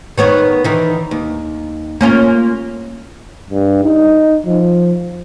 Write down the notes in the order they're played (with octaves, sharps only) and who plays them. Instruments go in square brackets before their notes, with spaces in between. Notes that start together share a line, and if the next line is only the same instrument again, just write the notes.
[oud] D#3 B3 C#5
D#3 E3
D#2
A#3 C#4 F4
[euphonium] G2
D#4
F3